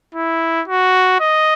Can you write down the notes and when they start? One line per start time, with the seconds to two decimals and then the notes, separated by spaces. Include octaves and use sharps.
0.15 E4
0.68 F#4
1.20 D#5